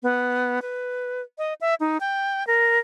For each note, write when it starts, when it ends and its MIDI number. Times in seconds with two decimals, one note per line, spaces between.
0.03 0.59 59
0.62 1.22 71
1.38 1.54 75
1.61 1.75 76
1.80 1.98 63
2.01 2.46 79
2.47 2.79 70